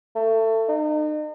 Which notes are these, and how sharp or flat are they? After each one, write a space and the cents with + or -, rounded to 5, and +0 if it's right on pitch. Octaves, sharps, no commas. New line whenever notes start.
A3 +25
D#4 -40